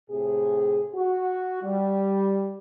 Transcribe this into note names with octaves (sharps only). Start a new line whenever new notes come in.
A2 C3 G#4
F#4
G3